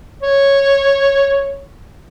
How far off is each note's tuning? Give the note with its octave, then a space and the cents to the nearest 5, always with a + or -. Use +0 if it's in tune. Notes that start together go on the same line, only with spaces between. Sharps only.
C#5 -5